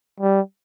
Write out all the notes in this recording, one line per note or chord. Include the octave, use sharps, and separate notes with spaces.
G3